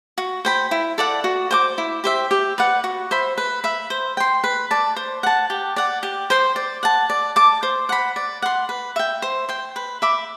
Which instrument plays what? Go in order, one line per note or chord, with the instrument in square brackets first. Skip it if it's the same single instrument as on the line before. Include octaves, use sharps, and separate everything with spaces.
[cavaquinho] F#4
C5 G5 B5
E4
A4 D5 F#5
F#4
C5 G5 D6
E4
G4 C5 E5
G4
B4 D5 F#5
F#4
C5 E5 B5
B4
E5 B5
C5
G5 C6
B4
D5 A5
C5
F#5 A5
G4
D5 F#5
G4
C5 G5 C6
D5
F#5 A5
D5
A5 D6
C5
F#5 B5
D5
F#5 C6
B4
E5 G5
C5
G5 C6
B4
E5 B5 D6